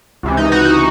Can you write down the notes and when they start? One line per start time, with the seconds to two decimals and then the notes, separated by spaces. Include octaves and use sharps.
0.23 C#2 C3 E3
0.37 D#4
0.52 D#4 F#4
0.65 D#4